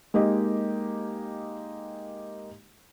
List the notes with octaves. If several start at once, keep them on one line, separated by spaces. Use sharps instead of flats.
G#3 A#3 D#4 G4 D#5